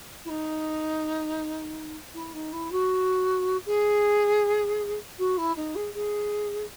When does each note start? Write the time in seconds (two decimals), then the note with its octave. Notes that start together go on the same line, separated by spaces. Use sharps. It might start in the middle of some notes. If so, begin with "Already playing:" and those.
0.25 E4
0.29 D#4
2.14 E4
2.33 D#4
2.52 E4
2.71 F#4
3.66 G#4
5.18 F#4
5.37 E4
5.56 D#4
5.75 G#4
5.94 G#4